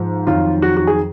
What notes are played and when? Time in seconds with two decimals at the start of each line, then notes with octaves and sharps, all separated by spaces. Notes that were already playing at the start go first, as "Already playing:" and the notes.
Already playing: G#2 F3
0.26 F2 D#3 F#3 F4
0.62 F#4
0.77 F#4
0.87 G#4